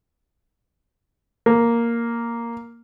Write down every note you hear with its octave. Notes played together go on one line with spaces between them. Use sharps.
A#3